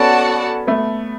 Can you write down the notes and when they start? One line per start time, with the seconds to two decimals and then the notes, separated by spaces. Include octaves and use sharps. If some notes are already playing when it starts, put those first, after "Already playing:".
Already playing: B3 C#4 F#4 A4 D5 F#5 A5
0.67 A3 B3